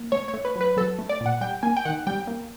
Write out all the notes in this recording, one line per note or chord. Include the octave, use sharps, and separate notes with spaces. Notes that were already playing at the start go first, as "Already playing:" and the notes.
Already playing: A#3
A3 C#5
C#5
A3
B4
F#3
B4
F#3 A4
A3
D5
A#2 F#5
G3 G5
A#3 G#5
G5
D#3 F#5
G3 G5
A#3